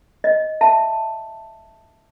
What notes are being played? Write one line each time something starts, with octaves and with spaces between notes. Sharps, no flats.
D#5
E5 A5